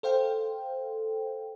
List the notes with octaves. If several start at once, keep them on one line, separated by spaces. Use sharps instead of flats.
A4 C5 F5 G5